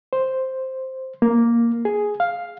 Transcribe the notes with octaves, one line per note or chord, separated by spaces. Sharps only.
C5
A#3
G#4
F5